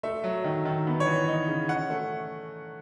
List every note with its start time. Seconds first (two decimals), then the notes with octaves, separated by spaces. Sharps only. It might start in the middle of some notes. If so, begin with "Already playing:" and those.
0.03 A3 E5
0.24 F#3
0.44 D#3
0.65 D#3
0.87 B3
1.00 C#5
1.06 E3
1.28 D#4
1.48 C#3
1.69 C#4 F#5
1.90 A3